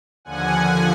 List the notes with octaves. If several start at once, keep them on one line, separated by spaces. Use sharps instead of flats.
D#2 D3 F3 F#5 G#5